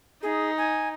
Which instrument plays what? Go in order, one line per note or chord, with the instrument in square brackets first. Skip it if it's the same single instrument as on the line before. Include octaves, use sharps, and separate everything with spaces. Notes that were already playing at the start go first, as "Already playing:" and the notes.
[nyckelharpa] D#4 [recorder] G#4
[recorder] G#5